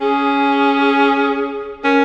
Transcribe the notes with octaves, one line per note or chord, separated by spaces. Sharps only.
C#4 G#4
C#4 A#4